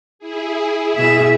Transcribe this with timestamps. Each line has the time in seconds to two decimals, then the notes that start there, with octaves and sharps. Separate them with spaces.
0.19 E4 G#4
0.96 B2 E5